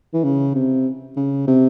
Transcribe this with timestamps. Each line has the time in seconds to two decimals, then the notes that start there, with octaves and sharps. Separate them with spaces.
0.13 E3
0.23 C#3
0.55 C3
1.17 C#3
1.47 C3